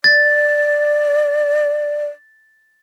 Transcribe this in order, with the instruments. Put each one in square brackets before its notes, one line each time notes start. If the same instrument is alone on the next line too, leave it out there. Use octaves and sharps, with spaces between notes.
[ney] D5 [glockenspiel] A6